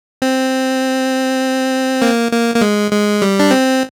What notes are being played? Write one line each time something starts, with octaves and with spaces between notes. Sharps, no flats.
C4
A#3
A#3
A#3
G#3
G#3
G3
D4
C4